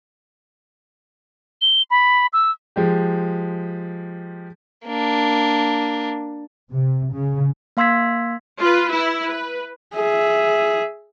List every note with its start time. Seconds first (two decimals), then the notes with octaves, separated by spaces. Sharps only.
1.61 G7
1.90 B5
2.33 E6
2.76 F3 G#3 G4
4.85 A#3 D4
6.72 C3
7.14 C#3
7.77 A#3 F5 C6 E6 G#6 B6
8.59 F4 B4
8.91 E4
9.25 B4
9.95 G#4 E5